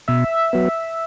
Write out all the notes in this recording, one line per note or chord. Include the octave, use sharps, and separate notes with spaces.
B2 E5
F#3 B3